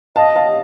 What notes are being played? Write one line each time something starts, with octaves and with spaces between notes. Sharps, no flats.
D#5 F5 A5
F5 A5